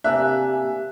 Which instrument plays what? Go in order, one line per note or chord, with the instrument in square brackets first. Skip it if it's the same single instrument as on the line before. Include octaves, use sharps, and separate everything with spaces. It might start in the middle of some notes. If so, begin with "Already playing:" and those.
[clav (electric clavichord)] C3 A#3 D4 [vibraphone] G4 G#5 [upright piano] E5 [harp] F#6